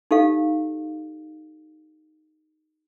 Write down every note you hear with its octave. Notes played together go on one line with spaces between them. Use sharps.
D#4 G4 A4 F5